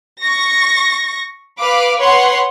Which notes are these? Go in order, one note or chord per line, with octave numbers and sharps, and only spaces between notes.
C#6 A#6
B4 F5 D6
B4 C#5 F#5 C6